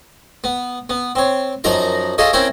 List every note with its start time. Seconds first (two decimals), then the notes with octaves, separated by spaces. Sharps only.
0.44 B3
0.90 B3
1.15 C4 C#5
1.64 F#2 F3 D#4 A#4 A#5
2.18 F4 G#4 A4 C#5 D#5
2.33 C4 C#4 E4 A#4 C#5 G5